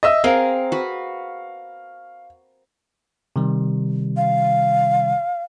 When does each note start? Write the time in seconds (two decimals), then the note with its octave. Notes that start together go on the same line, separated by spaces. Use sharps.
0.03 D#5 E5 E6
0.24 C4 G#4 A#4 F5
0.72 F#4 B4
3.36 C3 D#3 G3
4.17 F5